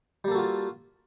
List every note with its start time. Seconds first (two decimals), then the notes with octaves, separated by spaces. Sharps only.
0.24 G3
0.28 A#3
0.31 A4
0.35 F#4
0.38 F4